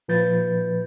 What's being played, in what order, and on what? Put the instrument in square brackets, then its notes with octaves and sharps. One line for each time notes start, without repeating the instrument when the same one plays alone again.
[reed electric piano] A#2 F3 B4 G6 A6